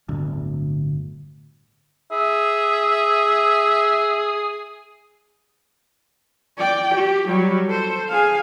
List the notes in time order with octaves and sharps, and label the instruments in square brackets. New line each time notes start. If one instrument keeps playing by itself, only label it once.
[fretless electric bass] D1 G1 D2
[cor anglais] G#4 [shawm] E5
[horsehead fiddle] D5 G5
G4
F#3 G3
A4 C5
G#4 F5